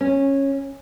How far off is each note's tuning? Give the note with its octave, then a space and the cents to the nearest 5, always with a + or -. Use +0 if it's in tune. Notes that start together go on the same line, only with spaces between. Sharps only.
C#4 -15